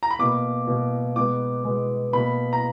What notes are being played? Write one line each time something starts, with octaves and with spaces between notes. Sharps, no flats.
A#5
B5
B2 A#3 D6
B2 A#3
B2 G#3 B3 D6
B2 G#3 B3
B2 A#3 B5
A#5